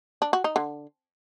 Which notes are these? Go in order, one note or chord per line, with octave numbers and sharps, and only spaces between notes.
D4
F#4
D#4
D3